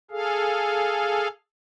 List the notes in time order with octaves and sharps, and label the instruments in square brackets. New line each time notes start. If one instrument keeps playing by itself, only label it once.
[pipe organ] G#4 A4 F5